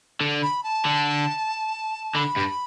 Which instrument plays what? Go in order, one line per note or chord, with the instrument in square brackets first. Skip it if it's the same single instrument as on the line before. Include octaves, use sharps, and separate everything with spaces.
[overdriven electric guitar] D3
[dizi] B5
A5
[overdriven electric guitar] D3
[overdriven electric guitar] D3 [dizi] B5
[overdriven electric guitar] G2